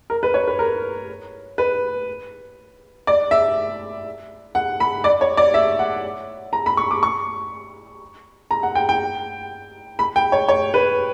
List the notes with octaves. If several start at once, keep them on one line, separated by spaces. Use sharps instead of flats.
A#4
B4
C#5
B4
A#4
B4
D5
E5
F#5
B5
D5
C#5
D5
E5
F#5
A#5
B5
C#6
D6
C#6
A#5
F#5
G5
G5
B5
G5
C#5
C#5
B4